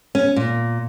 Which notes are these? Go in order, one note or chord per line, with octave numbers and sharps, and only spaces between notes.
C#4
A#2